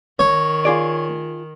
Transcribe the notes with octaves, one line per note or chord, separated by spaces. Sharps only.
D#3 C#5
F4 G#4 D5